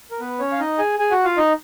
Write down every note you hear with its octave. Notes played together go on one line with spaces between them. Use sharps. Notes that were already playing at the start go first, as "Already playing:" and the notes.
A#4
B3 B4
C#4 C#5
F5
D#4 D#5
G#4 G#5
G#4 G#5
F#4 F#5
F4 F5
D#4 D#5